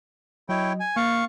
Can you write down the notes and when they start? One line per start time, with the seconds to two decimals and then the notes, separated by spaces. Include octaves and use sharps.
0.49 F#3 E4 C#5 D#5 G5
0.80 G#5
0.96 A#3 F5 C#6 A6